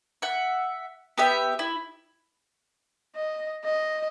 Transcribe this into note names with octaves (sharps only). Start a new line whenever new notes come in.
E5 F#5
B3 G4 E5
E4
D#5
D#5